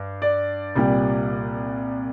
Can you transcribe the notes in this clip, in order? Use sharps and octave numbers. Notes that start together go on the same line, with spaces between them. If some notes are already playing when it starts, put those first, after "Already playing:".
Already playing: G2
D5
C2 A#2 G3